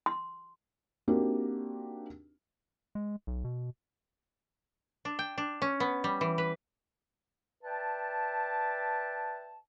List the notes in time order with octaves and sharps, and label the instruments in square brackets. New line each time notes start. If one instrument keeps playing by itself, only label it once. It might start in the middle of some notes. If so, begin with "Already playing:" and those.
[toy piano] C6
[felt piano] A#3 C4 D4 D#4 F#4 G4
[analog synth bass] G#3
B1
B2
[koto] D4
G5
D4
C#4
B3
G3
E3
B4
[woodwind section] B4 D5 E5 G5 A5